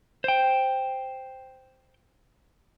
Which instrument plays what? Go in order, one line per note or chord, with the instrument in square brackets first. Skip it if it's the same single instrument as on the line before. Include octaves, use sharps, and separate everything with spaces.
[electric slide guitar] C5 G5